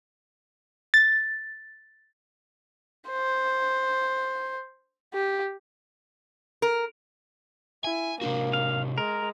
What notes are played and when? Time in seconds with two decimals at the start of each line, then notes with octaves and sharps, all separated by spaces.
0.94 A6
3.09 C5
5.14 G4
6.62 A#4
7.84 E4 G#5
8.21 C3 A#3 D4 F#4
8.53 F5
8.98 G#3 A#4